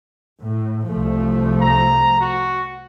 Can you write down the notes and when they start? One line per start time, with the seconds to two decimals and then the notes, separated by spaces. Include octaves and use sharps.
0.40 A2
0.87 C2 F3 A3
1.61 A#5
2.20 F#4